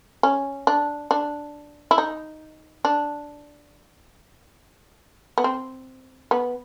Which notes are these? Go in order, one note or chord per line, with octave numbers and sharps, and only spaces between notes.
C#4
D4
D4
E4
D#4
D4
B3
C4
B3